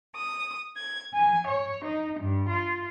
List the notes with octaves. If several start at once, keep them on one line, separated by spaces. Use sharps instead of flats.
D#6
G#6
G#5
C#5
D#4
G2
F4